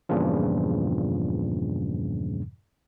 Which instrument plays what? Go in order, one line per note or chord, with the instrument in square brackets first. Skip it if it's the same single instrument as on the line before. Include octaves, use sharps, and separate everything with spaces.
[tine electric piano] E2 G2 A#2 C#3 F3